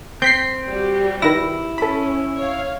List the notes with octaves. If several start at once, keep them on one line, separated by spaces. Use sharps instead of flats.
C4 G6 B6 C7
G3 F#4 G4
D#3 E4 B4 A#6
C#4 A4 B5
C#5 F5